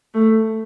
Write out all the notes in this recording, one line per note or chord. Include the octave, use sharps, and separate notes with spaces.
A3